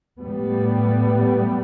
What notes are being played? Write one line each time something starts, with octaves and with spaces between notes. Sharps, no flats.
A2 G3 B3